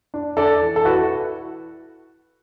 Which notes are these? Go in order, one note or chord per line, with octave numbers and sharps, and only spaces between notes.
D4
D4 A4 D5
E3
A4
E4 F#4 B4